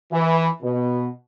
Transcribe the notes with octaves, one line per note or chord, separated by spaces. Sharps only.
E3
B2